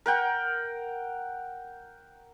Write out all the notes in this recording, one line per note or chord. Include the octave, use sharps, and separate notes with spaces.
A#4 F#5 G5